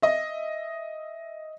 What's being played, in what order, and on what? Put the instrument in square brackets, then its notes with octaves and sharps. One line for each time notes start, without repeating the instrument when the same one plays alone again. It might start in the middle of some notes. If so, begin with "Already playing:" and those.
[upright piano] D#5 E5